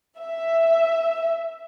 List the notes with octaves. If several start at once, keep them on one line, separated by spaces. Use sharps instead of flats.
E5